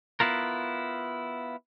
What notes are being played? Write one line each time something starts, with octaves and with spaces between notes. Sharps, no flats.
B3 E4 F4 A#4